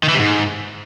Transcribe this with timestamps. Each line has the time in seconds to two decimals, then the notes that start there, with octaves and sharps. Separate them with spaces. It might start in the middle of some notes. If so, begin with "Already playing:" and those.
0.03 D#3
0.09 E3
0.14 C3
0.19 G#2